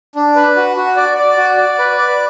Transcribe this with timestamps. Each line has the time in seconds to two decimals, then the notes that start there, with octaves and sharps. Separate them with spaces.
0.15 D4
0.36 B4
0.57 F#4
0.77 F#4
0.96 D5
1.18 D5
1.37 F#4
1.57 D5
1.79 B4
1.98 D5